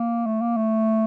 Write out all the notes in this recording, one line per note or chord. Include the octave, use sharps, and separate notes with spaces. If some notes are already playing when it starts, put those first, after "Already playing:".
Already playing: A#3
A3
A#3
A3